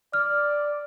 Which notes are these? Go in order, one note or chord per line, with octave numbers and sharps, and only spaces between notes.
D5 F6